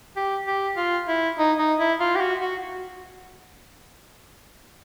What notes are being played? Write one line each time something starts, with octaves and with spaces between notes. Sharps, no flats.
G4
G4
F4
E4
D#4
D#4
E4
F4
G4
F#4
F#4